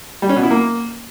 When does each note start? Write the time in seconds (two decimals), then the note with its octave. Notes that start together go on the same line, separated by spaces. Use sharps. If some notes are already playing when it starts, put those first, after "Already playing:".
0.22 G3
0.29 C#4
0.36 B2
0.43 E4
0.51 A#3